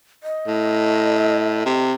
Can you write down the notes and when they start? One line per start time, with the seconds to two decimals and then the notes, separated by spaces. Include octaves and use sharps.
0.23 D#5
0.47 A2
1.66 C3